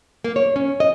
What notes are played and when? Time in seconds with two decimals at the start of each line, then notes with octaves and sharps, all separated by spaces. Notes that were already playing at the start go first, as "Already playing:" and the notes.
0.24 A#3
0.36 C#5
0.56 C#4
0.80 D#5